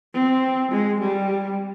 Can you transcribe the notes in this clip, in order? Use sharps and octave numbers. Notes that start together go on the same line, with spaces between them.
C4
G#3
G3